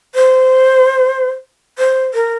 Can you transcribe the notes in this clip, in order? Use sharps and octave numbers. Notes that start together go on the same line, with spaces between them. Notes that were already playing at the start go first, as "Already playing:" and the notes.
C5
C5
A#4